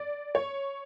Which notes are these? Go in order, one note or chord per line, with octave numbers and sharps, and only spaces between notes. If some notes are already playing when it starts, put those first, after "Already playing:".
Already playing: D5
C#5